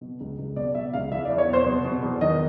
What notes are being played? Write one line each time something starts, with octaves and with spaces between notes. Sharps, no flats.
B2
C#2
C#2
B2 D5
B2 E5
C#2 F5
E2 E5
D5
E2
C#5
B2 C5
B2
B2
E2
D#3 D#5